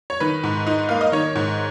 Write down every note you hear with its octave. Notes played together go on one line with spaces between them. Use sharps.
C#5
D#3 B4
G#2
D#4
A#3 F5
D#5
D#3 C#5
G#2